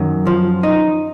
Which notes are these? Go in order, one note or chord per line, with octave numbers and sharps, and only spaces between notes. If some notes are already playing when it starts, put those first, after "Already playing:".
Already playing: F#2 D#3
F3
D#4